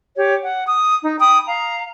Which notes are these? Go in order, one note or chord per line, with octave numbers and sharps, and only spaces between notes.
G4 C#5
F#5
D#6
D#4
G5 B5 D#6
F5 A#5